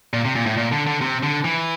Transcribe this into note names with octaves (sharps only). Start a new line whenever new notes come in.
A#2
C3
A#2
A2
A#2
D3
D3
C3
D3
E3